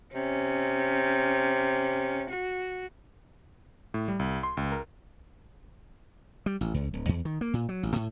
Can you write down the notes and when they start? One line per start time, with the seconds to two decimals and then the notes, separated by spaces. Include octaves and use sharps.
0.14 C3 C#4
2.30 F#4
3.94 A2
4.08 G3
4.19 C2
4.43 C6
4.57 C#2
4.72 A#4
6.46 G3
6.61 A1
6.74 C#2
6.94 D1
7.09 E2
7.25 D#3
7.41 A#3
7.54 A#2
7.69 F#3
7.83 A1
7.96 A2